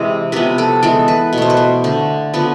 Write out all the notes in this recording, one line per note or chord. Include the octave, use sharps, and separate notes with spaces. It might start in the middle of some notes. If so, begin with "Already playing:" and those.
Already playing: C3 E3 G#3
C3 F3 B3 B4
A4
E3 G#3 B3 A4
B4
B2
A3 C5
B4
C5
D3 A3
D3 F3 B3 B4